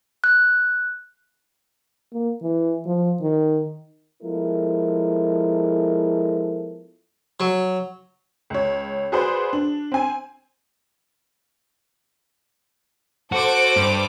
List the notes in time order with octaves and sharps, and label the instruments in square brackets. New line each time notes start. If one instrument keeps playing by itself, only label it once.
[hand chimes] F#6
[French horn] A#3
E3
F3
D#3
[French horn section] F3 G#3 B3 E4 A4 A#4
[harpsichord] F#3
[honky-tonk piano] C#2 C#5
F#4 G#4 B4 C5 D5
D4
C4 G#5
[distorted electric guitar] F#4 [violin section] A4 C5 D6
[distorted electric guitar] G2